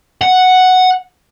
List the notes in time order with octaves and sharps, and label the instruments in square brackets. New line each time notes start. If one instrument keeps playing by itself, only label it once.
[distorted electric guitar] F#5